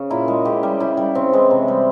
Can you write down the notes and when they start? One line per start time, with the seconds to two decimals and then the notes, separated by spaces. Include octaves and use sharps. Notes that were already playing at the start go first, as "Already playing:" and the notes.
Already playing: C#3
0.10 A#2 E4
0.28 G#3
0.45 C#3 G4
0.63 G3
0.80 C#3 E4
0.97 G3
1.15 C#3 C4
1.33 E3 G#3
1.51 C3
1.68 G3